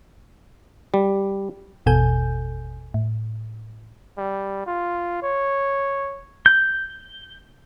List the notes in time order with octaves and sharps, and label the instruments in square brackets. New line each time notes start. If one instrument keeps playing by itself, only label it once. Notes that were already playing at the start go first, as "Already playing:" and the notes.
[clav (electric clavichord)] G3
[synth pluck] G#1 E2 B2 A4 G#5 G6
A2
[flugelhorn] G3
F4
C#5
[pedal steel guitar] G6